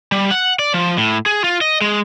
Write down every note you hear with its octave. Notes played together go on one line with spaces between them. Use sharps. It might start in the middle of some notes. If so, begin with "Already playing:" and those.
G3
F#5
D5
F3
A2
G#4
F4
D#5
G#3